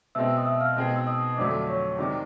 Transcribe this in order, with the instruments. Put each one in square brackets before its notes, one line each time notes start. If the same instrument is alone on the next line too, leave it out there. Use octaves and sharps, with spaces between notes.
[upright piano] B2 G#3 C4 [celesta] E5 E6
[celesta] D#6
E5 E6
F5 F6
[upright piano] B2 G#3 C4 D#4 G#4
[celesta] E6
D#5 D#6
[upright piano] F2 D3 F#3 A3 [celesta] D5 D6
[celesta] C#5 C#6
[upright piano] C3 D#3 G#3 [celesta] D5 D6